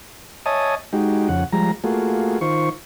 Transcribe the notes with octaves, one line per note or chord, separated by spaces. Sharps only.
C#5 D#5 E5 G#5 A5 D#6
G#3 D#4 F#4 G4
F2 C#3 F#5
F3 G3 G#3 A#5
A3 A#3 F4 F#4 G#4
D#3 F4 C5 C#6